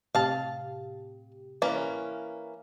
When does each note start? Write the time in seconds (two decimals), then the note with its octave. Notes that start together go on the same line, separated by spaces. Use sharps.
0.15 A2 C3 G4 F5 A5
1.62 E3 A#3 C#4